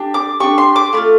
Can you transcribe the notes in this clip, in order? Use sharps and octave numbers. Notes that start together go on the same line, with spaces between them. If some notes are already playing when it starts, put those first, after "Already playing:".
Already playing: D4 G4
D6
D4 G4 C#6
C6
D6
A3 D4 F4